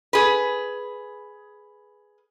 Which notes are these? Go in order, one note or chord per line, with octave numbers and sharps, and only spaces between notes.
G#4 B4